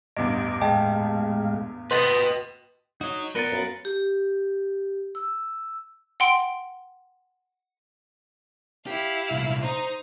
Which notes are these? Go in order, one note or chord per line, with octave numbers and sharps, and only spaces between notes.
A1 E2 G2 D#5 A#5 D6
A2 G#3 D#5 F5 G5 A5
B4 D#5 G5 C6 D#6 A6
D#4 F#4 C#5
A#2 B3 F4 A#4 B4 A6 C#7 G7
F#2
G4
E6
F#5 G5 C6 D7
E4 G4 F5
C2 A#2
D#4 C5